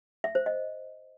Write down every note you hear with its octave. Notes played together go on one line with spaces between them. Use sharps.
E5
C5
D#5